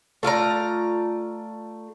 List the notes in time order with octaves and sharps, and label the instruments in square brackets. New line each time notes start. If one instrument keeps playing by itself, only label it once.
[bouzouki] A3 F4 D5 A#5